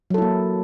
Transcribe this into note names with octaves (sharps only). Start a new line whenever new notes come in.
F#3 A#3 E4 A4